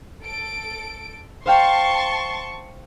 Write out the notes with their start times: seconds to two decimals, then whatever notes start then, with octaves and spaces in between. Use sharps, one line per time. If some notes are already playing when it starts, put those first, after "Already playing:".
0.24 A4 D7
1.46 C5 F5 G5 A5 C6 C#6